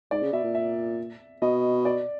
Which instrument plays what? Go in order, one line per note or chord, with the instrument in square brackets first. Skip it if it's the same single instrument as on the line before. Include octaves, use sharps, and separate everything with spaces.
[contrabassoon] G#2 [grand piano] D5
[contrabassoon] C#3
[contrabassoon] B2 [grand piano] E5
[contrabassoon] A#2
[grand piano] E5
[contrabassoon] B2 [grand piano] D#5
[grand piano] D5